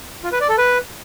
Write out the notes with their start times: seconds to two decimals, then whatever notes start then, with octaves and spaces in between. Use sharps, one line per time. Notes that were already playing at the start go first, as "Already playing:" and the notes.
0.23 F4
0.32 B4
0.41 D5
0.49 A4
0.58 B4